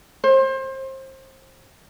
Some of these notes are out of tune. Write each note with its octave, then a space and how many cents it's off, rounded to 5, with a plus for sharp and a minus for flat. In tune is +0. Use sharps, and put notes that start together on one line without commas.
C5 +30